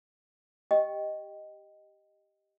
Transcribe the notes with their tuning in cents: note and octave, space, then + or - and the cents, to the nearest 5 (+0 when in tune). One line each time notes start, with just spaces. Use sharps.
G4 +0 D#5 +0 G5 +0